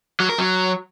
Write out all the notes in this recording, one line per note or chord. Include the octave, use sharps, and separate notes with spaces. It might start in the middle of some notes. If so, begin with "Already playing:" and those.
F#3
A#4
F#3